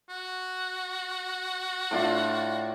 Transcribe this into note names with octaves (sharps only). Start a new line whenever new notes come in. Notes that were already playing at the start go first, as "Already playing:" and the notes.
F#4
A2 D4 F4